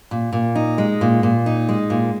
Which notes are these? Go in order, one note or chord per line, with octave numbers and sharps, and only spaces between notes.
A#2
A#2
D#4
G#3
A#2
A#2
D#4
G#3
A#2